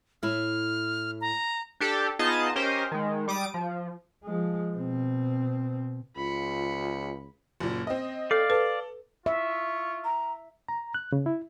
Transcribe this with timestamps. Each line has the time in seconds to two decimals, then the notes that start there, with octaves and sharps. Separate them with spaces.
0.23 A2 E4 F6
1.21 A#5
1.80 D4 G4 A4
2.19 B3 D#4 F4 G#4 D#5 A5
2.56 C#4 G4 A#4 C5 D#5
2.92 D#3 G#3
3.28 G3 D6 D#6 D7
3.54 F3
4.24 F3 G#3
4.77 B2 C4
6.16 C#2 F4 B5 C#7
7.60 F#1 A#2
7.87 C4 D#5
8.31 A4 D5 F5
8.50 A4 B4
9.26 F4 E5 C#6
10.04 A#5
10.69 A#5
10.94 F#6
11.12 C#3
11.26 E4